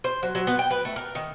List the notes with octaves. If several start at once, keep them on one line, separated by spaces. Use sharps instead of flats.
C5
F#3
F#3
B3
G5
B4
A3
A#4
D#3